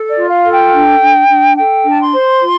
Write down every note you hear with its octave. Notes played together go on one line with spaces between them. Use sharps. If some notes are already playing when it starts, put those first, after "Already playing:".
Already playing: A4
D5
F4
F5
A4
G5
D4
D4
D4
A4 G5
D4 A5
C6
C5
F4